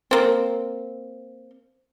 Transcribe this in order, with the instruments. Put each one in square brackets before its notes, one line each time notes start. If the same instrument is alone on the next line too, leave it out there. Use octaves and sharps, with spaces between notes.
[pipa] A#3 C4